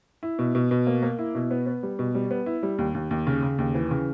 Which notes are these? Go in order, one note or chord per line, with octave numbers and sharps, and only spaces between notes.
E4
B2
B2
B2
A#3
A#3
E4
B2
B3
B3
G3
B2
G3
B3
E4
G3
D#2
D#2
D#2
C#3
C#3
D#2
E3
C#3